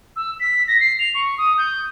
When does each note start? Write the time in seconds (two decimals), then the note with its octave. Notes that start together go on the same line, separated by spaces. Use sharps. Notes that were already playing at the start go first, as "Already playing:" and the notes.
0.16 E6
0.40 B6
0.67 A#6
0.80 C7
0.99 F7
1.14 C#6
1.38 D#6
1.58 G6